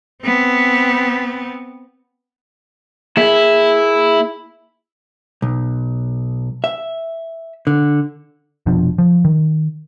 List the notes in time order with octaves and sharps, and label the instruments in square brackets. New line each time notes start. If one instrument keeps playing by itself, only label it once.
[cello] B3 C4
[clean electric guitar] A#3 G#4 E5 [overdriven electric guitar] E4
[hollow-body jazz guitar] B1
E5
D3
[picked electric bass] F1 B2 F3 D4
F3
D#3